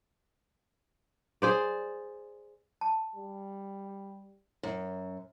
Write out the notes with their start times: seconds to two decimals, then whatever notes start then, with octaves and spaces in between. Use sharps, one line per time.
1.42 G#4 C5 D5
2.81 A5
3.16 G3
4.63 F#2